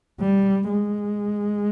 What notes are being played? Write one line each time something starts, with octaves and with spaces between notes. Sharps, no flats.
G3
G#3